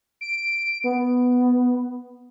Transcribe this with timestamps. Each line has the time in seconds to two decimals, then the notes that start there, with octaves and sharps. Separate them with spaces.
0.21 D7
0.84 B3